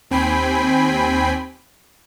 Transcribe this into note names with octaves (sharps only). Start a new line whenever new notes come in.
D#2 C4 G5 G#5 B5 C7